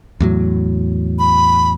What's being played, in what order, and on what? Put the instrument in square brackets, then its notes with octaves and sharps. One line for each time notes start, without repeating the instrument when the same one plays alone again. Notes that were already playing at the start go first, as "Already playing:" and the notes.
[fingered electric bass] E2 A2 F#3
[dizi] B5